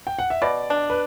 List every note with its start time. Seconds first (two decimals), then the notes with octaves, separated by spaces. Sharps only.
0.07 G5
0.19 F#5
0.30 E5
0.42 B2 D5
0.70 D4
0.90 B4